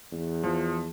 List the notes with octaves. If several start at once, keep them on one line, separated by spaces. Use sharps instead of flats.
E2
F3